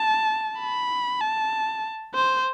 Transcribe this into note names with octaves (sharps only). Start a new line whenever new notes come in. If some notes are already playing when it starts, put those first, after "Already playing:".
Already playing: A5
B5
A5
C5